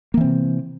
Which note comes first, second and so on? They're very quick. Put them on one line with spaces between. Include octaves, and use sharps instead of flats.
A#3 E3 C4 C3